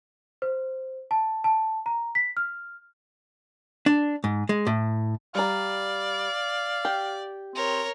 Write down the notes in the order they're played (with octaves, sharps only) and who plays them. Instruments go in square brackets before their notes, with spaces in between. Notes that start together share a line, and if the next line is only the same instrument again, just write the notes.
[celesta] C5
A5
A5
A#5
B6
F6
[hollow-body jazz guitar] D4
G#2
G#3
A2
[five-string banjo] G3 A#5 [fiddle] D5 [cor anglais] F5
[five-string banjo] G4
[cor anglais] C4 [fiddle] A#4 C#5